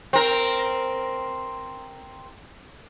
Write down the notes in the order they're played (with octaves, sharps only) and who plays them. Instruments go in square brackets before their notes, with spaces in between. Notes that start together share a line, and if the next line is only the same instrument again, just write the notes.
[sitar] C4 A#4